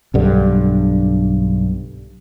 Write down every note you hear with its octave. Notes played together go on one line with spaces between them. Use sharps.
B1 G2 D3